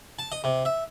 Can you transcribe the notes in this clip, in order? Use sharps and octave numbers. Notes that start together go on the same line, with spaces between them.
A5
D#5
C3
E5